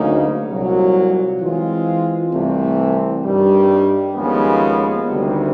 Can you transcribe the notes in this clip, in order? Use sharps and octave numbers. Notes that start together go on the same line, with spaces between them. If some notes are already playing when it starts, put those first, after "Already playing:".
Already playing: D2 C#3 F#3 A#3 D#4
C2 A#2 F#3
E3 G#3 C4 F4
C2 C3 E3 A3 C4
G2 D#3 G3
D#2 C#3 F3 G#3 B3
D2 C3 D#3 G3